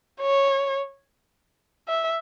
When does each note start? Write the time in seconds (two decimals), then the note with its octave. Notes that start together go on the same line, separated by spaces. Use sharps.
0.22 C#5
1.88 E5